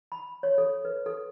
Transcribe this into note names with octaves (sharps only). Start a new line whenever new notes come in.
B5
C#5
A4
B4
A4